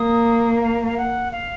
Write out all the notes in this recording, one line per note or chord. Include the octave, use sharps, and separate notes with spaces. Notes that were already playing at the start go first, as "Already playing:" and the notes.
Already playing: A#3 D#6
F5
F5
F#5
F5